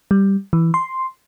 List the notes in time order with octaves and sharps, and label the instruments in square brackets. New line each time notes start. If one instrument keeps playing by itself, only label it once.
[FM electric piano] G3
E3
C6